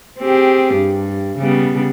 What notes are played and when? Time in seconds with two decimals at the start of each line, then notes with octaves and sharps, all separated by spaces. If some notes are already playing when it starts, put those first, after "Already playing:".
0.19 C4 G4 G#4
0.74 G2
1.39 C#3 G3 B3